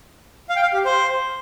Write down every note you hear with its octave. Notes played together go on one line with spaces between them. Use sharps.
F5
G5
F5
G4
C5